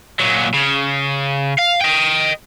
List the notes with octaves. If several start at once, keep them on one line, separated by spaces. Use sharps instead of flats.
A#2 F#3
C#3
F5
D#5 G5